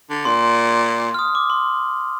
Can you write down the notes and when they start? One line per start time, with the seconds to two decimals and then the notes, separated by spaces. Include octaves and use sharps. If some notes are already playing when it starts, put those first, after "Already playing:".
0.10 D3
0.25 A#2 C6
1.14 F6
1.19 D#6
1.35 D6
1.50 C6